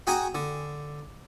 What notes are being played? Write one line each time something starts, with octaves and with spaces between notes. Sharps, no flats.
F#4 G#4 G5 G#5 A#5 D6
D3